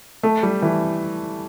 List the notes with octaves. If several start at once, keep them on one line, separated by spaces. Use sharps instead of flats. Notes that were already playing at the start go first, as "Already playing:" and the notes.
A3
G3
E3